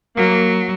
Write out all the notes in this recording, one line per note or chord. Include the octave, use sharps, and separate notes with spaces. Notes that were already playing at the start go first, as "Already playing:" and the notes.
F#3 A#3